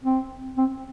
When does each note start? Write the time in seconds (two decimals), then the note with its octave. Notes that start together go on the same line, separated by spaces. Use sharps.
0.04 C4
0.57 C4